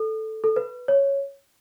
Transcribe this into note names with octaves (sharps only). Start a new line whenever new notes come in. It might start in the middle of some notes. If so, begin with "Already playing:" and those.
Already playing: A4
A4
B4
C#5